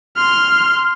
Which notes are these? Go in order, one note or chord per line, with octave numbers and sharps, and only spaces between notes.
C6 F6